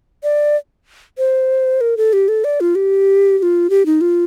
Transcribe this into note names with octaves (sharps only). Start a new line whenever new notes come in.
D5
C5
A#4
A4
G4
A4
D5
F4
G4
G4
F4
G4
D#4
F4